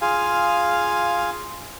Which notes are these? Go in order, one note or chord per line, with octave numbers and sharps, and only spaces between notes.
F4 G#4 F5 G#5